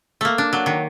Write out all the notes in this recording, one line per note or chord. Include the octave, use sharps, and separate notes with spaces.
A3 A#3
D4
F#3
D#3